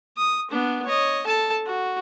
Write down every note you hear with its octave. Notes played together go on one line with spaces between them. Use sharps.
D#6
B3 D4
C#5 D#5
A4 A5
F#4